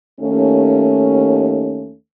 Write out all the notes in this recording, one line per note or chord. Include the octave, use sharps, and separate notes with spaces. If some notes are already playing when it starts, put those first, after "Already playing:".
D#2 A3 C#4